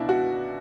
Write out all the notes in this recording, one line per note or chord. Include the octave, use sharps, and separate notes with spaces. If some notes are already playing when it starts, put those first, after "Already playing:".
Already playing: C#2 B2 D4 E4
F#4